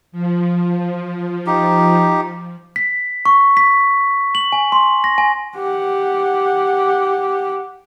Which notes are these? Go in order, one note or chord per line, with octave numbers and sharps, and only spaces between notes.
F3
D#4 G4
B6
C#6
B6
F#7
G#5
C6
A#6
G#5
G4 F#5